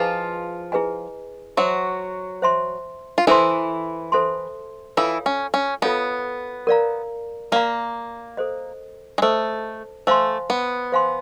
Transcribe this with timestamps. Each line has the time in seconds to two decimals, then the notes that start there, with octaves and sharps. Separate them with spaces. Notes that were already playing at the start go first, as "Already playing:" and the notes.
Already playing: F3 E4 F4 G#4 B4 D#5 G#5
0.72 E4 G#4 B4 D#5 G#5
1.57 F#3 F#4 C5 E5 A5 C6
2.42 C5 E5 A5 C6
3.18 F4
3.27 E3 E4 A4 C5 E5 A5 C6
4.12 A4 C5 E5 A5 C6
4.97 E3 E4 F4 A4 C#5 F5 A5
5.26 C#4
5.54 C#4
5.82 B3 F4 A4 C#5 F5 A5
6.67 A#4 D5 F5 A#5
7.52 A#3 A#4 D5 F5 A#5
8.37 A4 C5 D#5
9.18 G#3
9.22 A3 A4 C5 D#5
10.07 A3 C5 F5 G#5 C6
10.50 B3
10.92 C5 F5 G#5 C6